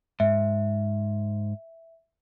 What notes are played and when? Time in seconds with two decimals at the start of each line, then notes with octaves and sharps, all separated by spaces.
0.20 G#2 E5